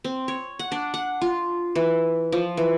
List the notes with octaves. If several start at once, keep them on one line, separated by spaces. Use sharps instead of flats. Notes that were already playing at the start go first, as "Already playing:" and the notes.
C4
C#5
F#5
D4
F#5
F4
E3
F3
E3